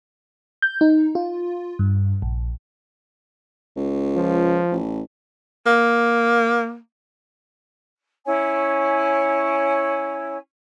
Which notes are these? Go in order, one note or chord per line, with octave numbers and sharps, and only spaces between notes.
G6
D#4
F4
G2
A#1
C#2
F3
A1
A#3
C#4 E4 C#5 G#5